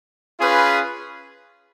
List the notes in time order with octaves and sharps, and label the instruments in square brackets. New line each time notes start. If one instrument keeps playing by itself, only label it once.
[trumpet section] C#4 F4 G#4 B4